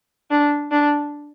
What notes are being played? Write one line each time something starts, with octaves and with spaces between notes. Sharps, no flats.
D4
D4